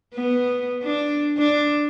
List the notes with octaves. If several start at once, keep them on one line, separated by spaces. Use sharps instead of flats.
B3
D4
D4